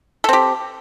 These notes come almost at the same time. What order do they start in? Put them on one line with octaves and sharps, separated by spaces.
A4 C4 G4